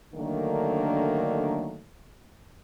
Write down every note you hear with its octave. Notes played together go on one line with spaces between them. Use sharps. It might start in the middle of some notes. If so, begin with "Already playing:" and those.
D3 D#3 F#3 A3 A#3 D4